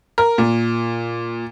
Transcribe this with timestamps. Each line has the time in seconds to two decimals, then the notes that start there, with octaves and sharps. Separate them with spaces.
0.18 A#4
0.38 A#2